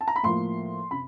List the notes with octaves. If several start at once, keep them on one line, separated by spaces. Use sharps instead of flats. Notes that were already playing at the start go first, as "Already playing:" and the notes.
A5
A#5
B5
A2 F3 A#3 C6
C3 B5